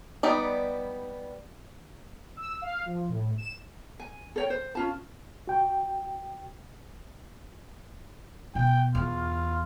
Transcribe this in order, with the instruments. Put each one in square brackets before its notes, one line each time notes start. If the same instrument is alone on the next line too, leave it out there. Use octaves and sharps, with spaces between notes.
[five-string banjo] G3 B3 D#4 D5
[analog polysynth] E6
F5
F3
A2
E7
[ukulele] G#5
A4 C#5 G5
C5
C#4 F4 A5
[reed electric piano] F#4 G5
[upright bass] B2 [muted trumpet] G5
[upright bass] E2 [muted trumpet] F4